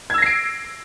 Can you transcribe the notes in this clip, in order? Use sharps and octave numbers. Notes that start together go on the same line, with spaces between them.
E6 G#6 A#6 C7 D7